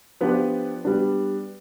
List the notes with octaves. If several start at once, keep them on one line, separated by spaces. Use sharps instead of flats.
F3 B3 D4 G4 B4
G3 B3 D4